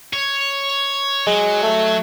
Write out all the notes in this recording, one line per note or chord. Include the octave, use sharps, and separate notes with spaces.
C#5
F#3 G#3
A3